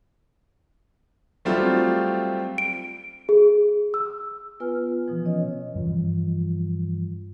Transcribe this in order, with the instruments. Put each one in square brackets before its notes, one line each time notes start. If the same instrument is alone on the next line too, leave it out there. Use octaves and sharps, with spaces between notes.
[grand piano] F#3 G3 A3 C4 F4 G4
[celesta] D7
G#4
E6
[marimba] B3 F4 B4 G#5 F6
B2 E3 F3
C#4 C#5 D#5
[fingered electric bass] G2 E3 F3